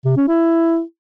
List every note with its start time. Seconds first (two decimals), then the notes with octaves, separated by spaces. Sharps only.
0.05 C3
0.17 C#4
0.28 E4